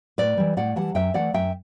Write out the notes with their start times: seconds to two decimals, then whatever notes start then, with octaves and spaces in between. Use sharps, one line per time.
0.18 A2 B4 D5
0.37 E3 G3
0.57 A2 D5 F#5
0.76 E3 G3 F#5 A5
0.95 F#2 E5 G5
1.14 E3 A3 D5 F#5
1.34 F#2 E5 G5